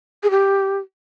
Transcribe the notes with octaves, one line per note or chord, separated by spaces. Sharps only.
G#4
G4